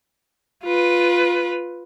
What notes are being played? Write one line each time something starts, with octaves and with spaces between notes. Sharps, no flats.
F4 B4